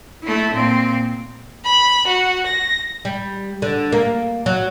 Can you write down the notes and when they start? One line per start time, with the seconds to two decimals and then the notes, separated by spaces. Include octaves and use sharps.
0.23 A3 E4
0.53 A#2 C4
1.65 B5
2.08 F#4
2.47 A#6
3.05 G3
3.62 D3
3.93 A#3
4.46 F#3